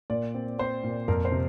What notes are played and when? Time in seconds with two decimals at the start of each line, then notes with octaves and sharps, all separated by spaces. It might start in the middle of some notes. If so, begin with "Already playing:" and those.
0.10 A#2 D5
0.35 C4
0.59 C4 C5
0.84 A#2
1.08 F2 A#4
1.25 C5
1.32 C3